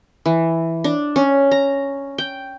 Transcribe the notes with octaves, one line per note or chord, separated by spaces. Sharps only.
E3
D4
C#4
A#5
G5